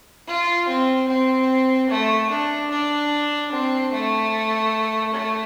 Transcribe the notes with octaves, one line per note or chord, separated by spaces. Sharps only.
F4
C4
C4
A3
D4
D4
C4
A3
A3